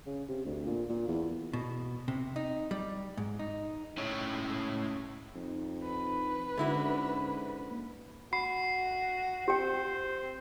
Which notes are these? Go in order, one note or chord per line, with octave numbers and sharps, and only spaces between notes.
C#3
C3
D2
A#2
A#2
E2
B2
C3
D#4
G3
G#2
D#4
A2 C#3 G#3 E4 C#5
F2 D#4
B4
G#2 D3 C#4 E4 F#4
A#3
F#4 B5 C7
C4 G4 C5 G5